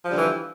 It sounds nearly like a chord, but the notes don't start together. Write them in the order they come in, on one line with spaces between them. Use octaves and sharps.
F3 G3 D3 E3